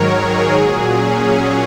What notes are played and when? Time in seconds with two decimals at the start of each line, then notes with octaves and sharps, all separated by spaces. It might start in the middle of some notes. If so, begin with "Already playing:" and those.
Already playing: G#2 D#3 F#3 A#4 C#5
0.18 G#4
0.52 A#2 F#3
0.87 C#4